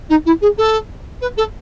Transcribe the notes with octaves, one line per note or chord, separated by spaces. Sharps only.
D#4
E4
G#4
A4
B4
A4